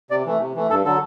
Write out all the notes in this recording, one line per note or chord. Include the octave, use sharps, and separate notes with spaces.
C3 D5
E3 A3
C3
E3 A3
G2 A4
D3 F#3 A4